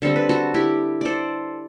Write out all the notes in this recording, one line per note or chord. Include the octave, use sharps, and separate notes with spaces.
D3 G3 C4 A4
B4
F#4 A4
E4 G4
A4 C5 D5